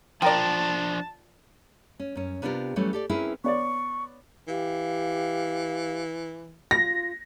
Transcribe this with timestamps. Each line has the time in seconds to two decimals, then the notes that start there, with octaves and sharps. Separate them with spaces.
0.22 F3 D4 F4 A#4 D5 G5 A5
2.00 C#4
2.15 F#2 C#4
2.42 C3 B3 D4 F4 G4 A#4
2.76 E3 F#3 G3 A3 C#4
2.93 G4 A4 D5
3.09 C4 C#4 E4 G#4 A#4 B4
3.44 B3 C#5 D5 C#6
4.47 E3 G4 F5
6.71 F4 A#6